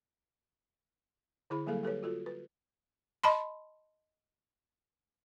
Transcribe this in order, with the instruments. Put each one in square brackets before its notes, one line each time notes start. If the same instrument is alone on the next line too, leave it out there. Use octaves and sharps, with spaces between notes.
[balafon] D3 E4 G#4 B5
F#3 G3 A#3 G#4 A4 F5
G4 A4 B4 C#5
F4 F#4 A4
B4
D#5 A5 B5 C6